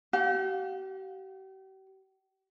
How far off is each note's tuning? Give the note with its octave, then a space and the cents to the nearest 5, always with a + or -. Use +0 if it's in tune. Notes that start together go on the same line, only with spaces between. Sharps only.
G4 -40 F5 +45